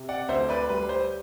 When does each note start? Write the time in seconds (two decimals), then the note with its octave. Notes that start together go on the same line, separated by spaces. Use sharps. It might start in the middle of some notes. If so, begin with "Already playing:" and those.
Already playing: C3
0.09 D5 F#5
0.28 D2 C5 E5
0.49 B4 D5
0.69 G3 B4
0.89 C5